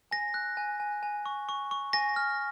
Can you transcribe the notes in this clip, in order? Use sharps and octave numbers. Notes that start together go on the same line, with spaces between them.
G#5 A#6
F#6
G#5
G#5
G#5
C#6
C#6
C#6
G#5 A#6
F6